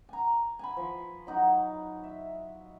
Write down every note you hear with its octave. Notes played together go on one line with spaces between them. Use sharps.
G#5 A#5
G#5 B5
F3
F#3 D#4 F#4
E5